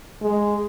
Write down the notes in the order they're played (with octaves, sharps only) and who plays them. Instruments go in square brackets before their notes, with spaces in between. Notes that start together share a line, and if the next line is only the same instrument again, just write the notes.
[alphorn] G#3